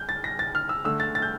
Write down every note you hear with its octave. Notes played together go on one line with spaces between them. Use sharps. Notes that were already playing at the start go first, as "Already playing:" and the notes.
Already playing: G6
A6
A#6
A6
F6
E6
D3 A3 E6
A6
A6
G6